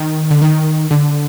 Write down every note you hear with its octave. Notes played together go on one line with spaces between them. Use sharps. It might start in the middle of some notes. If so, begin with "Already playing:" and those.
Already playing: D#3
D3
D#3
D3